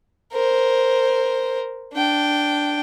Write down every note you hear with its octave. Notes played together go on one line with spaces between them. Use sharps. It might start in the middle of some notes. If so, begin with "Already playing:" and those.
A#4 C5
D4 G5